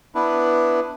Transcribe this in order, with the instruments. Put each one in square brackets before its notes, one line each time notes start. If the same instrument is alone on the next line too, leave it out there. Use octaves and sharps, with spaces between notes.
[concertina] B3 D4 E4 B4